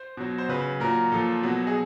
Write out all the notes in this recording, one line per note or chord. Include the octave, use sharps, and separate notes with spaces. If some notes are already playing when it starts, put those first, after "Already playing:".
Already playing: C5
B2 F#3
C5
C#3 F#3 B4
A#2 F#3 A#4
A#2 F3 A4
B2 F#3
G#4